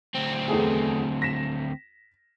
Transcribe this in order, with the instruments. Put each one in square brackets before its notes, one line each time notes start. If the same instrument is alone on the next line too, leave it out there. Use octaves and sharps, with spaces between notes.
[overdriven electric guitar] D2 C4
[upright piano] E2 A3 G#4
A#6 B6 E7